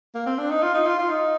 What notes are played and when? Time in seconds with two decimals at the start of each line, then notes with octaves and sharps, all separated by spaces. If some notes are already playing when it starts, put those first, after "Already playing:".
0.15 A#3
0.26 C4
0.38 D4
0.50 D#4
0.62 F4
0.74 D#4
0.86 F4
0.98 F4
1.10 D#4